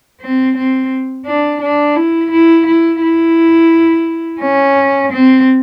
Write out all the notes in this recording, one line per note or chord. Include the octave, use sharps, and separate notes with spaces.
C4
C4
D4
D4
E4
E4
E4
E4
C#4
C4